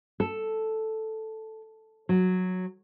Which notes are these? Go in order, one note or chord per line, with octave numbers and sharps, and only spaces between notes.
A4
F#3